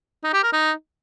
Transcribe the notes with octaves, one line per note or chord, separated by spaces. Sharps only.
D#4
G4
A#4
D#4